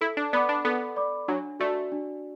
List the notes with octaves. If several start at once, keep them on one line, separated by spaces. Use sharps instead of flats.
E4 A4
D4
B3 D5 B5 D6
D4
B3 A4
D5 B5 D6
F#3 D4
A3 F#4 D5
D4